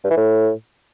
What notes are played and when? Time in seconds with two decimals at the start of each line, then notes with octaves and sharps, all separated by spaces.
0.04 G2
0.10 E3
0.17 A2